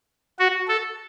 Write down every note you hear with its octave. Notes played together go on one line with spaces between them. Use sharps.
F#4
A4